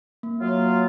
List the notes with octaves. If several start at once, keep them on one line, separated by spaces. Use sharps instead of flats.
A#3
F#3 F4